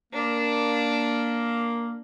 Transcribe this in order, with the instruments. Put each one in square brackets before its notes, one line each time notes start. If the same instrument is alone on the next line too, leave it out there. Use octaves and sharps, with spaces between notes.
[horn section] A#3 [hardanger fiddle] D4